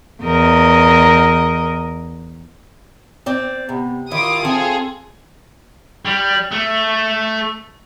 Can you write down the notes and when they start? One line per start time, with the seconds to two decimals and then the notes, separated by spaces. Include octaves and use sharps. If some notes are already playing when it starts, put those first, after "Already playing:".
0.22 E2 A#4 D#5
3.26 C4 D5
3.69 C3 B3
4.11 D#3 E4 F4 D6 D#6
4.45 C4 F4 G#4 A4
6.05 G3
6.52 A3